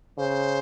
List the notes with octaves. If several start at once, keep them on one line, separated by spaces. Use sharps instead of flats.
C#3 C5